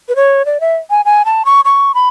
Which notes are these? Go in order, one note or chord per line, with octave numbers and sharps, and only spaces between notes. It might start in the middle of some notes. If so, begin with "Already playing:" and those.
B4
C#5
D5
E5
G#5
G#5
A5
C#6
C#6
B5